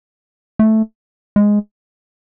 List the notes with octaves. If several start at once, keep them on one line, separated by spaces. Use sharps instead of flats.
A3
G#3